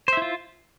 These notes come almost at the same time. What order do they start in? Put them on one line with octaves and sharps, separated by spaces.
C5 E5 E4 F4